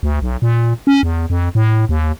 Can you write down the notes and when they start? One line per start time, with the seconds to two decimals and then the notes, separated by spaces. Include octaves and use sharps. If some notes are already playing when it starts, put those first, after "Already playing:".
0.03 D2
0.22 B1
0.42 A#2
0.87 C#4
1.03 E2
1.30 F2
1.55 A2
1.89 D#2